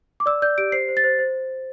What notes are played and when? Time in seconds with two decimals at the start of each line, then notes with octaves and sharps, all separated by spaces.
0.20 D6
0.26 D5 E6
0.42 D5 G6
0.58 G4 D7
0.72 C5 C7
0.88 C5
0.97 A6
1.04 C5
1.19 C5